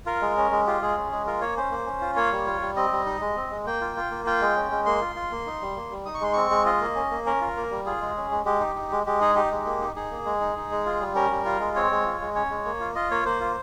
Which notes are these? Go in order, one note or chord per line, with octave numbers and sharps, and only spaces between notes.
F4 A#4
G#3
C#4
G#3
F4 G4
G#3 G#4
C#4
G#3
F4 A#4
A#3 C#5
C#4 C5
A#3
C#4
F4
A#3 C#5
G3
F4
G3
C4 D#5
G3
D#4
G#3
C4
G#3
A#3 G5
F4
F4
A#3
F4 G5
G#3
C#4
G#3
A#3 C6
F4
F4
A#3
D#4
G3
A#3
G3
D#4 D#6
C#6
G#3 C6
C4 C#6
G#3
F4 D#5
A#3
C#4
A#3
C#4 A#4
F4
A#3
G3
F4 G#4
G#3
C#4
G#3
G#3 G4
D#4
D#4
G#3
G#3 G4
D#4 G#4
D#4 G4
G#3
A#3
D#4
D#4 G#4
A#3
G#3
D#4
D#4
G#3
F4
G3
C#4 A#4
G3
F4
G#3
C4 C#5
G#3
F4
G#3
C#4 C#5
G#3
A#3
F4
F4 D#5
A#3 C#5
A#3 C5
F4